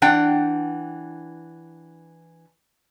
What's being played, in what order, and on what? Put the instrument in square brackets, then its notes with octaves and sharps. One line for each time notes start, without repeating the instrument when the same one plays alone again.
[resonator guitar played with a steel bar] E3 D4 F#5 G5